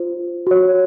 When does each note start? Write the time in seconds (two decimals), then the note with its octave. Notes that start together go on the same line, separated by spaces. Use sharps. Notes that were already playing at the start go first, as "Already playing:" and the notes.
Already playing: F4 C5
0.47 F#4 C#5